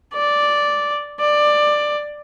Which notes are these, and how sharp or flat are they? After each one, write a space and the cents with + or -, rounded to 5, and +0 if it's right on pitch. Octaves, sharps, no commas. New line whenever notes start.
D5 -5
D5 +15